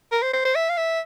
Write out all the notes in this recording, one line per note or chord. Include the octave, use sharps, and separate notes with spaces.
A#4
C5
C5
C5
E5
F5
E5